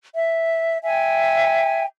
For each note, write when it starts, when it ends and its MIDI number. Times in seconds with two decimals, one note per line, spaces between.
0.16 0.78 76
0.84 1.85 76
0.84 1.85 79
0.84 1.85 80